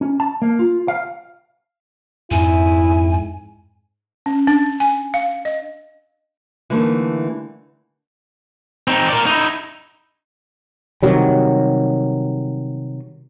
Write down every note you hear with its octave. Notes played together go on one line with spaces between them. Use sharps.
C#4
A5
A#3
F4
F5
F2 G#2 E4 G#5
C#4
D4
G#5
F5
D#5
D3 E3 G3 A3 A#3 D#4
C4 D#4
A#4 D5
D#4 E4
C3 D#3 F#3 G3